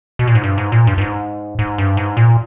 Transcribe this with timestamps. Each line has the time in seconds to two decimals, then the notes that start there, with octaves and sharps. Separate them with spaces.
0.19 B2
0.27 A#2
0.35 G#2
0.43 G2
0.58 G#2
0.72 A#2
0.87 G2
0.98 G2
1.01 G#2
1.59 G#2
1.78 G2
1.97 G#2
2.17 A#2